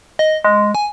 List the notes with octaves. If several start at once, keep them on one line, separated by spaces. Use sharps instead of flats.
D#5
G#3
G#5